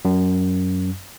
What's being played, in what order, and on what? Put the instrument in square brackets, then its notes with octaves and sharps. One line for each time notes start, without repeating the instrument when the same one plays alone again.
[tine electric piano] F#2